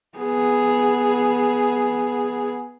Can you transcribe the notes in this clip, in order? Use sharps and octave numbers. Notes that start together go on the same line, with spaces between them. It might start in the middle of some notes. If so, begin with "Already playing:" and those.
B3 G#4